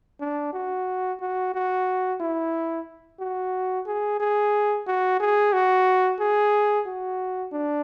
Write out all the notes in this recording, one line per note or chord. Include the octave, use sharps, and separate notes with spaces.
D4
F#4
F#4
F#4
E4
F#4
G#4
G#4
F#4
G#4
F#4
G#4
F#4
D4